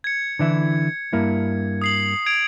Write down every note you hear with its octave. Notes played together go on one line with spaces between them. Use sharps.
G#6 C#7
D3 E3 E4
G2 A#3 E4
D#6 C7 F#7
G#6 D7 F7